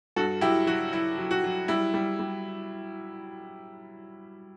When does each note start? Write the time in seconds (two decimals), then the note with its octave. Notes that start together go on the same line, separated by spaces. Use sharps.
0.16 G2 F#4 A4
0.41 F#3 E4 G4
0.67 F#3 F#4
0.92 F#3 E4
1.18 F#3
1.31 F#4
1.44 F#3
1.68 G3 E4
1.94 G3
2.19 G3